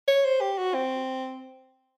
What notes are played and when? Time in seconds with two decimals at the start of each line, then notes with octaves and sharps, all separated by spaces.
0.08 C#5
0.25 C5
0.41 G4
0.58 F#4
0.74 C4